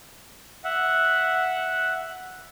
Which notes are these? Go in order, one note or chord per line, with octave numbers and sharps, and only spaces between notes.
E5 F#5